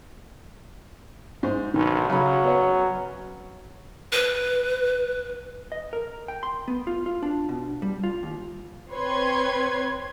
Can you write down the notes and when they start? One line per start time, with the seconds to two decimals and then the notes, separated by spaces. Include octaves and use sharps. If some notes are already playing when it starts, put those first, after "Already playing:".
1.43 G#2 C5
1.74 B1 D#3
2.10 C#3 F#3 B5
2.44 B3 C#5
4.12 B4
5.72 D#5
5.93 A#4
6.28 G5
6.43 C6
6.68 B3
6.87 F4
7.06 F4
7.22 D4
7.49 B2
7.82 G3
8.04 F4
8.23 D#2
8.91 C4 B4 C#5 C6 G#6